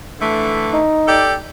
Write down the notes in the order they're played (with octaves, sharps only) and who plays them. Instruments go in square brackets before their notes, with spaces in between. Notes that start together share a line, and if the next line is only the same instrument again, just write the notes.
[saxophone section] D3 E3 A3
[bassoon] D#4
[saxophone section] G4 A4 D5